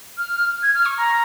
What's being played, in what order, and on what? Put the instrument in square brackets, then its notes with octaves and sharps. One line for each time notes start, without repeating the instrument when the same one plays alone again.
[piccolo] F6
G#6
F6
C#6
A#5